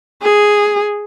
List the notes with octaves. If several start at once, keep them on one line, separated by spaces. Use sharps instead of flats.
G#4